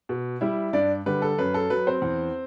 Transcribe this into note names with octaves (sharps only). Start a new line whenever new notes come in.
B2
G3 E4 E5
G2 D4 D5
D3 G3 B4
A4
F#2 B4
A4
F#3 B4
C4 C5
E2